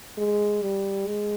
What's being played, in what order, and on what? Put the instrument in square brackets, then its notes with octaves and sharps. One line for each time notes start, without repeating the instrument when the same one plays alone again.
[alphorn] G#3
G3
G#3